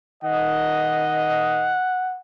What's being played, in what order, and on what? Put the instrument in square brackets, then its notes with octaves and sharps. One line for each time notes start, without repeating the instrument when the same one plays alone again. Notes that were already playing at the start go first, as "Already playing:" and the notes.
[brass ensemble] D#3 D#5 [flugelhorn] F#5